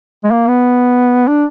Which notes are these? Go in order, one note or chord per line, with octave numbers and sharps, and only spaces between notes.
G#3
A#3
B3
D4